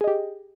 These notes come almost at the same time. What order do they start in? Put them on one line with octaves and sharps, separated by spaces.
G#4 D#5 G4